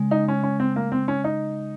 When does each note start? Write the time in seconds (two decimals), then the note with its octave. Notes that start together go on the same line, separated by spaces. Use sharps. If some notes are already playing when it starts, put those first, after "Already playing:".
Already playing: C#3 G#3
0.11 D#4
0.28 C#4
0.43 C#4
0.60 C4
0.76 A#3
0.92 C4
1.08 C#4
1.24 D#4